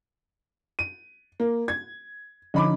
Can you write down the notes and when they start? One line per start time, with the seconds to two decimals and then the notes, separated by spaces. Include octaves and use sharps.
0.79 D#7
1.40 A#3
1.68 G#6
2.54 D3 F3 C#4 D#4 B5 D6